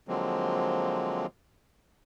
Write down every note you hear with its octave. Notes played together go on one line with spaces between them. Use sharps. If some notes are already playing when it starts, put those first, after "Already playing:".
D3 F3 F#3 G#3 A#3 C4